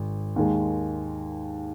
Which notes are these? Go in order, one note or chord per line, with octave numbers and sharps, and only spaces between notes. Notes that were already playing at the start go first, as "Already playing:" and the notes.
Already playing: G#1
D#2 D#3 G#3